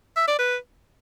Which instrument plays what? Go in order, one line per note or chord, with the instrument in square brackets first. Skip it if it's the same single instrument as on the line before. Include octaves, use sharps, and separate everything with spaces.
[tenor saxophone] E5
D5
B4